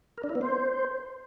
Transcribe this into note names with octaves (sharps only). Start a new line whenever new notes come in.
A#4
D4
E4
B3
C5